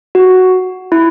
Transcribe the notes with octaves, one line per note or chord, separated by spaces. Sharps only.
F#4
E4